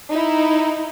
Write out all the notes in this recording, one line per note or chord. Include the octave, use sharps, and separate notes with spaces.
D#4 E4